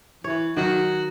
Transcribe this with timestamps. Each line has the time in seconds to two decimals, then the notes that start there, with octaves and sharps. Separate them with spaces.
0.24 E3 C#5
0.57 D#3 F#3 F#4